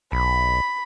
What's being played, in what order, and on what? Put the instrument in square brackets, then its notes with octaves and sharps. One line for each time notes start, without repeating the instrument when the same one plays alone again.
[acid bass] B1 [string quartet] B5